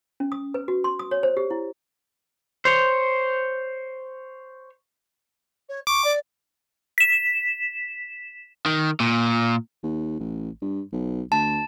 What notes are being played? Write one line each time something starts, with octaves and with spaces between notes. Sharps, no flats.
C#4
D#6
B4
F#4
C6
D#6
C#5
C5
G4
E4
C5 C#5
C#5
C#6 D6
D5
B6 E7
D#3
A#2
D#2
A1
G2
B1
D2 A5